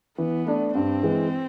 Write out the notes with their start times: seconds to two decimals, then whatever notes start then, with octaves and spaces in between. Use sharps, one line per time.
0.18 E3 B3
0.46 A3 D4
0.74 G2 C4
1.03 E3 G#3